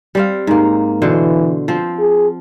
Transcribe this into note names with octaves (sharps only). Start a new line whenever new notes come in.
G3 C4 F5
G#2 A#3
B2 D3 E3 C5
F3 C4
G#4